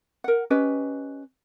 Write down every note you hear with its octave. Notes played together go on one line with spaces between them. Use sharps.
A#4 F#5
C#4 G4 B4 D#5